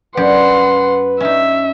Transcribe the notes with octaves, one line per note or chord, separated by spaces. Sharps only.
F#2 G4 B4 D5 F#5 C6
C#4 D#4 E5